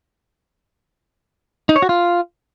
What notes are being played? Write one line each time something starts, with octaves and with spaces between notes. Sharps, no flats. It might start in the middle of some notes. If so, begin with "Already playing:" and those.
D#4
C#5
F#4
F4